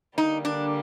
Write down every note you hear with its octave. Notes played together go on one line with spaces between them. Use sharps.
D3 G3 A#3 D#4
D4